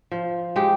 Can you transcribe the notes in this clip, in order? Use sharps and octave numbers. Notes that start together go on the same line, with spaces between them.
F3
G#3 G4